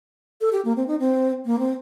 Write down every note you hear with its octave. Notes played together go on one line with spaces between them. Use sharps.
A4
G4
A#3
C4
D#4
C4
A#3
C4